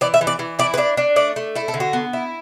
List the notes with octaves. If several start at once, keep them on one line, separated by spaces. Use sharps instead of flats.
E3 D5
E5
E3
D5
E3
E4 D5
B4
D4 D5
D4
A3 D5
A3
E4 A4
A4
D3
F#4
B3
E4